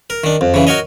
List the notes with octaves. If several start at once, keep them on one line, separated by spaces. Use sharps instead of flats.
A#4
D#3 D4
F2
C#3 E3
F#4 A#4 C#5 D#5